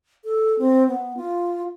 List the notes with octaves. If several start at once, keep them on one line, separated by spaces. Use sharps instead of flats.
A4
C4
B3
F4